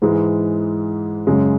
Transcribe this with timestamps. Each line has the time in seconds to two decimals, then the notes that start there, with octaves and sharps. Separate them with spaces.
0.02 G#2 E3 G#3
1.27 F#2 C#3 G#3